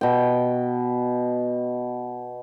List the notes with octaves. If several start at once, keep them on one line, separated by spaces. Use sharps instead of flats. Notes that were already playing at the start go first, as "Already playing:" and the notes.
B2 G5